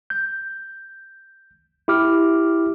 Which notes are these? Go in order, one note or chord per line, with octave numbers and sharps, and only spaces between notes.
G6
E4 G4 D6 F6